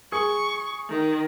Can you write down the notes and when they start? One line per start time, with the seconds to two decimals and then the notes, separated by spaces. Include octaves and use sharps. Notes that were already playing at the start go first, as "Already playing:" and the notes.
0.12 G#4 C#6
0.90 D#3